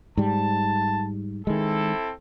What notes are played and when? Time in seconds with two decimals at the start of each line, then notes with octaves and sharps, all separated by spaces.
0.17 G#2 G3 A5
1.47 D#3 G#3 C4 E4 A4